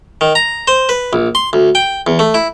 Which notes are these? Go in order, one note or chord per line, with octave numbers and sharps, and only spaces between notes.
D#3
A#5
C5
B4
A#1
C6
D2
G5
E2
A3
E4